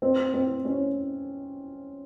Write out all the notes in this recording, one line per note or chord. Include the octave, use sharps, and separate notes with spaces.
C4
C4
C#4